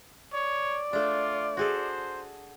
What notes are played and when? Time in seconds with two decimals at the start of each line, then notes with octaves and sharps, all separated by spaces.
0.33 C#5 D5
0.93 A3 D4 F4
1.57 F#4 G#4 A4 C5